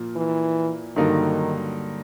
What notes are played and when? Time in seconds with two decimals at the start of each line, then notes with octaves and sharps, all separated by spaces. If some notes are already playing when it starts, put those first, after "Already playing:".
Already playing: A#2 F3 A#3
0.16 E3
0.96 G2 D3 D#3 F#3 A#3 D#4